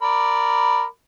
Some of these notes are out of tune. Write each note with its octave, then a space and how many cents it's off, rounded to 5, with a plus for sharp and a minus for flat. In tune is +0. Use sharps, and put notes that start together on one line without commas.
A#4 -10 D5 +0 B5 +0